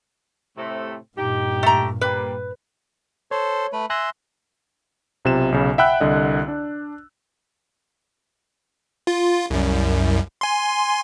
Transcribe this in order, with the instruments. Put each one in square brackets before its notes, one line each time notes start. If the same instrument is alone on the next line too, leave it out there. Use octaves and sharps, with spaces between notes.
[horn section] A2 C3 A3
[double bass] G2 A#2 [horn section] D#4 G4
[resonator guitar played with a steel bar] A3 A#5
[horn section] G3 A#3 [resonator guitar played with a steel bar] B4
[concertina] A4 C5 [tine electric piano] C#5
[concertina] A3 B4
[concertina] E5 C6 [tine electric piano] G#5 F#6 A#6
[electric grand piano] B1 C3 F4 E7
B1 C#3
E5 F#5 G5 B5 E6 F#6
C2 D3 D#5
D4
[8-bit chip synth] F4
C2 F#2
G#5 C6